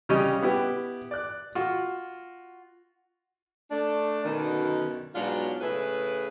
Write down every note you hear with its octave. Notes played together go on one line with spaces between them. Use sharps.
C#3 G3 C#4 D#5 D#6
B3 E4 G4
D5 F#6
F4 F#4
A3 D4
F#2 B2 D3 D#3
G#2 B2 F#3 D4 F4
A2 C#3 E4 G#4 B4